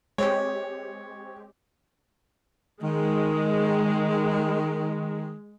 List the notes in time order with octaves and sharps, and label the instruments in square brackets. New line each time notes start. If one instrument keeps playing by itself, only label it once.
[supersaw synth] G#3 C4 G4 [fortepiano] C#5
[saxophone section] D#3 [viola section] G#3